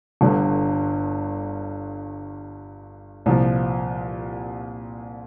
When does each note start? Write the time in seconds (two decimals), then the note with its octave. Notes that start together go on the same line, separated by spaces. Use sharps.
0.21 G1 G2 D3
3.26 C2 A#2 F3